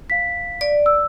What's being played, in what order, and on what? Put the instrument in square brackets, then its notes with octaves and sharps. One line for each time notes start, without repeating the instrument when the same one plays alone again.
[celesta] F5 B6
[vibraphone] D5
[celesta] E6